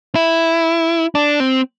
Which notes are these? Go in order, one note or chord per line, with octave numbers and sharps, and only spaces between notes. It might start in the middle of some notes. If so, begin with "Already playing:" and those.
E4
D4
C4